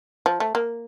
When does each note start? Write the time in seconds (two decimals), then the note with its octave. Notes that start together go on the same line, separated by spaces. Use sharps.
0.26 F3
0.40 A3
0.55 A#3